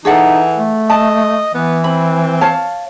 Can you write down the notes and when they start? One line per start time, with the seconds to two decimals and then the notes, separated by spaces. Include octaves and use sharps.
0.05 E3 D#4 G#4 A4 F#5
0.57 A3
0.90 D#5 A5
1.54 E3 B3
1.84 C4 B5
2.41 C#5 F5 A5